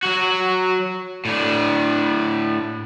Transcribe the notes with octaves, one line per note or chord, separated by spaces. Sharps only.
F#3 F#4
A2 D4